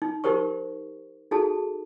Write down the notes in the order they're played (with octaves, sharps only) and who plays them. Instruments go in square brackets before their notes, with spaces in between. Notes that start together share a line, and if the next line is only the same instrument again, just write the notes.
[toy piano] D#4
D#4 G4 A#4 C5 C#6
D#4 F#4 G#4 A4 A5